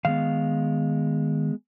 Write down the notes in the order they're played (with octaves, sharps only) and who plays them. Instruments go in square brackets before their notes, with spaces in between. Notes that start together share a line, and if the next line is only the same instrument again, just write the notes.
[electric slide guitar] D#3 G#3 B3 F5